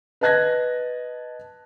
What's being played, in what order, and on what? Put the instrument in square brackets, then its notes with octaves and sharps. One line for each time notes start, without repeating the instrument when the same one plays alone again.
[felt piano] B4 D#5 A5 F#6 G#6 A#6